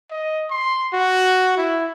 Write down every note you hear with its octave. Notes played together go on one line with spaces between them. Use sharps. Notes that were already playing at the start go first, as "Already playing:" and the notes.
D#5
C6
F#4
E4